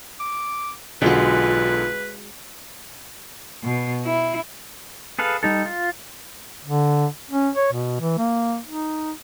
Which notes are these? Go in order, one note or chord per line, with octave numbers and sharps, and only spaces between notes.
D6
B1 D3 G#3 F4 F#4 B4
B2
E4
G#4 A4 B4 F5
G3 D#4 A4
F4
D3
C#4
C#5
B2
E3
A#3
D#4